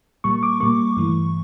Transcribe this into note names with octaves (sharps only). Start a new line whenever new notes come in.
A#2 G3 A#3 C#6
D6
A#2 G3 A#3 C#6
G2 E3 A3